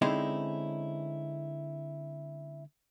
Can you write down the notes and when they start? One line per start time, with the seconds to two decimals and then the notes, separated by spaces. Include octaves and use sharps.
0.02 D3 G#3 C4 C#4 D#4 E4